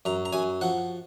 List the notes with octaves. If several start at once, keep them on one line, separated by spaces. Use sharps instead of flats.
F#2 A#5
A#5
F#2 G#5
F3 F#5